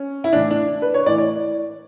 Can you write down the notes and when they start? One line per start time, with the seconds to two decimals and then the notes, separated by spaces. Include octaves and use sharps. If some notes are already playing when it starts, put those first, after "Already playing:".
Already playing: C#4
0.24 E4
0.33 A2 E3 D4
0.51 D4
0.82 B4
0.94 C#5
1.06 A2 E3 D5
1.18 D5